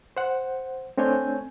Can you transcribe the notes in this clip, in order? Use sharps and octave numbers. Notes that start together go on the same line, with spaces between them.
C5 F#5
A3 C4 D4 C#5 G#5 G6